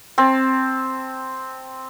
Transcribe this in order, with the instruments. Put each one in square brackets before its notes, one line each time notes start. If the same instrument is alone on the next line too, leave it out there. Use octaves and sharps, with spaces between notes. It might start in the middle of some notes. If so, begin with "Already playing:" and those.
[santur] C4 A5